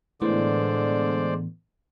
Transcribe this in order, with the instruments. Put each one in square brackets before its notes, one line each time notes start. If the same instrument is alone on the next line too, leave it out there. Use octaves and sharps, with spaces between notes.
[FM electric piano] A2 E3 B3 [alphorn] D3 [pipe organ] G#3 C5 D5